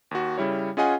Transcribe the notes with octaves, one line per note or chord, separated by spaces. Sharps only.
D#2 F#4
C#3 G3 E4 C#5
C#4 F4 G#4 D#5 F#5 G#5